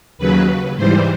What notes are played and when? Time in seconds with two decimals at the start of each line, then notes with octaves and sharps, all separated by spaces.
0.18 D#2 C#3 F#3 B4
0.77 G#2 E3 G3 C5